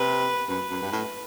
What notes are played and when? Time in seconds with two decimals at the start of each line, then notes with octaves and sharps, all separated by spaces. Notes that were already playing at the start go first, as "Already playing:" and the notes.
Already playing: C3 B4
0.48 F#2 B4
0.70 F#2
0.82 G2
0.92 A2